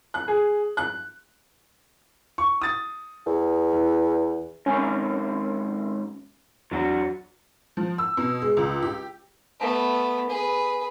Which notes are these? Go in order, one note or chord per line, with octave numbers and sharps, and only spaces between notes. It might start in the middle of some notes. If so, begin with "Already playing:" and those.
F#6
G#4
F#6
C#6
D#6 A6
E2
E3
G#2 C3 D#3 C#4
E2 F#3 D4 F#4
F3
E6
B2
G#3
C#2
G4
A3 B3
G#4 B4